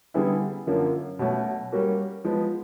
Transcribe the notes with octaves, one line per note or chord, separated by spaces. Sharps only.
D3 G3 B3 E4 G#4
F#2 D3 F3 A#3
B2 F#3 A3 C#4
G3 A#3 C#4 F#4
F3 G#3 B3